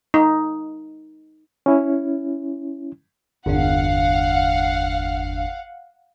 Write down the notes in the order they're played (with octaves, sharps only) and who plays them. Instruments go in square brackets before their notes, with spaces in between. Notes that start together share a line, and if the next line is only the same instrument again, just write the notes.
[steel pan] D#4
[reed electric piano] C#4 E4
[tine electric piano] G1 E2 D4 [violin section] F5 F#5